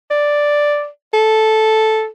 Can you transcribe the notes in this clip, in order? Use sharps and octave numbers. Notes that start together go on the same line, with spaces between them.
D5
A4